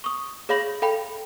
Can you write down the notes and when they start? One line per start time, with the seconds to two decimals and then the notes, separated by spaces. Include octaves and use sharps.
0.04 C#6 D#6
0.49 G#4 C#5 F5 B5 A#6 F#7
0.82 A4 F5 G5 B5